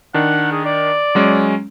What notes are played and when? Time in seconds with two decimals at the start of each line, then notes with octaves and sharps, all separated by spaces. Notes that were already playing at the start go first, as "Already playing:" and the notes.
0.14 D#3 D4 F#5
0.52 G#4
0.65 D5
1.15 F#3 G#3 C#4